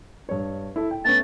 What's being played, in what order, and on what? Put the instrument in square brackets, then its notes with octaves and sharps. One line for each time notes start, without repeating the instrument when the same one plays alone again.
[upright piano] G2 C#5
E4 A4
G5
[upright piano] A3 B3 C#4 [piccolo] A6